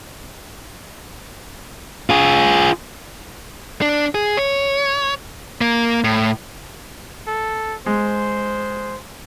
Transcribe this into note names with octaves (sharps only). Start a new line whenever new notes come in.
F4 G#4
D4
G#4
C#5
A#3
A2
A4
G#3 C5